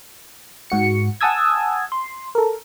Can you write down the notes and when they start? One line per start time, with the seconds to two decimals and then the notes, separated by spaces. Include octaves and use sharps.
0.70 G#2 F#4 C#7
1.21 F#5 G#5 A5 D#6 E6 G#6
1.92 C6
2.35 A4 A#4